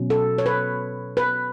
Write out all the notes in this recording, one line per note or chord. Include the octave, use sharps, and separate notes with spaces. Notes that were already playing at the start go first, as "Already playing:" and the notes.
Already playing: B2 F#3 C#4
A4
C#5
B4
B4